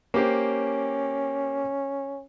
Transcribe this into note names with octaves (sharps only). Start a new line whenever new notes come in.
A#3 C#4 G4 C5